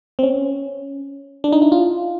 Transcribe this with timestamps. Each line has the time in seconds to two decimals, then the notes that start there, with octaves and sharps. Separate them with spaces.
0.19 C4
0.23 C#4
1.44 D4
1.52 D#4
1.62 E4
1.72 F4